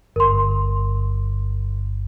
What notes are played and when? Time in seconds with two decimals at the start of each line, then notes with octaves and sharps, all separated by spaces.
0.16 G1 A#4 C6